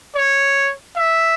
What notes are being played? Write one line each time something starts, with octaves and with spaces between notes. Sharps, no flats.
C#5
E5